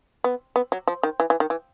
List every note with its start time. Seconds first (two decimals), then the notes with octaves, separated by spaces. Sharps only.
0.24 B3
0.56 B3
0.72 F#3
0.87 F3
1.03 D#3
1.20 E3
1.30 E3
1.40 D#3
1.50 E3